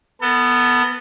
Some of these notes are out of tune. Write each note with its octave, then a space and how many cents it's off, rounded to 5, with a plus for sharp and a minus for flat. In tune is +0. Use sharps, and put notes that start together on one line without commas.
B3 +0 A4 +35